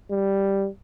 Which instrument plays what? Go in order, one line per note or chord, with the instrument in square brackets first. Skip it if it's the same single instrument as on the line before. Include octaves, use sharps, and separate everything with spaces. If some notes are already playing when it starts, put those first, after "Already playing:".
[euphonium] G3